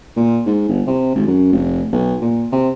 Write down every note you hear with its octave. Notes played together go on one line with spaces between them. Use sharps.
A#2
G#2
G1
C3
G#1
F#2
F1
B1
A#2
C3